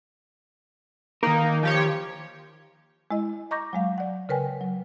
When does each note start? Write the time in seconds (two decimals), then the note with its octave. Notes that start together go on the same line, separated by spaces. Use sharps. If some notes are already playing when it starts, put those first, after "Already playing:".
1.23 D#3 A#3 D#4 A#4
1.63 F3 G4 C#5
3.11 G#3 E4 D#5
3.51 D#5 A#5 C#6 D6 G6 A#6
3.73 F#3 G#3 F5
3.98 D5 F#5
4.29 C#3 A#4 B4 G5 G#5
4.61 F#3